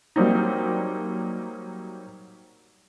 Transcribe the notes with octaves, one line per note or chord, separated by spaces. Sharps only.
F#3 G3 A#3 C4 D#4